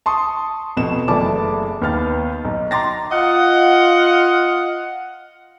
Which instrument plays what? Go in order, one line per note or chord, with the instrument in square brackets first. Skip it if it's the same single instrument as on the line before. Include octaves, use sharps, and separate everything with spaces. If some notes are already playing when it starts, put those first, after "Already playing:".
[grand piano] A5 C6 C#6 D#6
F1 B2 E7
F#1 E3 A3 D5 A5 D6
D#2 B3 F6 A6
B1
A#5 C6 D6 A6 A#6
[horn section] F4 D#5 F5 F#5